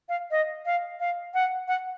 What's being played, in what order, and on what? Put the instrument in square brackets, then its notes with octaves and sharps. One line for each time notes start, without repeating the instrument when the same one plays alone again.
[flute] F5
D#5
F5
F5
F#5
F#5